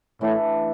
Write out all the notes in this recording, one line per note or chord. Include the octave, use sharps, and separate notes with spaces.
A2 E3 A3 D4 A4